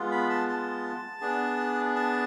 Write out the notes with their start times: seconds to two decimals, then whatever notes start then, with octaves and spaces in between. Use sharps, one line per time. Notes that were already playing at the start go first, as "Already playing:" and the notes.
Already playing: G#3 B3 F4
0.11 B5
0.30 A5
0.48 A5
1.21 B3 D4 G#4
1.95 A5